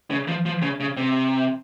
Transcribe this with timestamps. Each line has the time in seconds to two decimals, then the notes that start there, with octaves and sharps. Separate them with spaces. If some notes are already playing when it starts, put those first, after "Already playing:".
0.11 C#3
0.28 F3
0.46 F3
0.62 C#3
0.80 C#3
0.97 C3